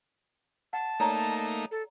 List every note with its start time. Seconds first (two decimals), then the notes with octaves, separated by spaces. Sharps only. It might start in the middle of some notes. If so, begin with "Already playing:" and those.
0.73 F#5 A5
1.00 A3 A#3 D#4 C#5 D5 A#5
1.71 A4